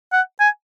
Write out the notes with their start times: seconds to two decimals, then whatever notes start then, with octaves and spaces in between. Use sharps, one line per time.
0.12 F#5
0.40 G#5